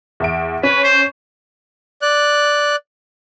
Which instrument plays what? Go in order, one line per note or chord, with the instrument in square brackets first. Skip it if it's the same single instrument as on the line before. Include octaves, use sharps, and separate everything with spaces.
[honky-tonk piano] E2 E5 D7
[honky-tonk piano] C#4 [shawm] B4
[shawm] C5
[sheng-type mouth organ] D5 F#6